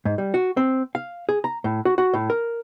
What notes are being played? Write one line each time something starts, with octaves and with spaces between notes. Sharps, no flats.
G#2
G3
F#4
C4
F5
G#4
A#5
A2
F#4
F#4
A2
A#4